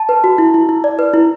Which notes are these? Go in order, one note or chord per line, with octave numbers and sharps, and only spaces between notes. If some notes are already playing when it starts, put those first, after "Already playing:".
Already playing: A5
B4
F#4
E4
E4
E4
D5
B4
E4